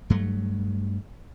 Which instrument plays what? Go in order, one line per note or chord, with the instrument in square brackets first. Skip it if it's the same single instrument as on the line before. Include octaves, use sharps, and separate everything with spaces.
[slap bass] G2 F#3 A3